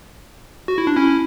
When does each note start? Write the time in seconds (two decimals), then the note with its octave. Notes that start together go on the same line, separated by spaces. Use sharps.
0.68 F#4
0.78 E4
0.87 D4
0.96 C#4 E4